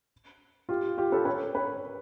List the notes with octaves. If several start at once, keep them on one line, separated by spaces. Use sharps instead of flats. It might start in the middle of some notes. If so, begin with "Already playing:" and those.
F4 G4
F4 G4
A4 B4
B4 C#5
B4 C#5